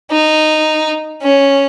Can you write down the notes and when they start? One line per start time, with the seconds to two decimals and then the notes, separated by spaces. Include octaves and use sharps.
0.11 D#4
1.22 C#4